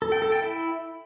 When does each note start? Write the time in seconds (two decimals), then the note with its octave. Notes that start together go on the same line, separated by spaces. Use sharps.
0.02 A4
0.12 G5
0.22 A4
0.32 G5
0.42 E4